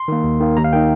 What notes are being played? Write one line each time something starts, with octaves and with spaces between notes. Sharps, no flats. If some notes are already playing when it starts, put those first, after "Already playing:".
Already playing: C6
D#3 A#3
D#2
D#3 A#3
D#2 A#5
F5
D#3 A#3 D#4 G5